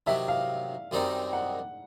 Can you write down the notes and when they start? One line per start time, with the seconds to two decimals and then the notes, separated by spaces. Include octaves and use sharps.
0.07 C3 D#3 F#3 E5
0.28 F5
0.91 F#2 D#3 G3 C4 D#4
1.33 F#5